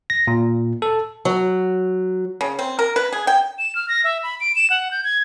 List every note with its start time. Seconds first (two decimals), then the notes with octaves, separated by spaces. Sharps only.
0.10 A#6
0.27 A#2
0.82 A4
1.25 F#3
2.41 C#3
2.59 C4
2.79 A#4
2.96 B4
3.12 G#4
3.27 G5
3.59 E7
3.75 F6
3.89 A#6
4.04 E5
4.23 B5
4.40 D7
4.56 E7
4.70 F#5
4.91 G6
5.04 G#6